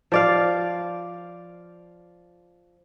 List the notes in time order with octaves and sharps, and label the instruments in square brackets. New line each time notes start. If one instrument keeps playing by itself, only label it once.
[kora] F3 D5 F5